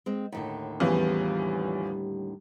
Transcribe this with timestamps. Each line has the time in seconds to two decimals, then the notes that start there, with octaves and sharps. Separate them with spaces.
0.06 G#3 C4
0.32 D#2 A2 D3
0.80 E2 E3 F3 G3 C#4 G4